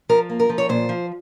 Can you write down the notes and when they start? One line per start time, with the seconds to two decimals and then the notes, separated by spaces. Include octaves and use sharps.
0.09 F3 A#4
0.30 A#3
0.40 A#4
0.49 F3
0.58 C#5
0.69 A#2 C5
0.89 F3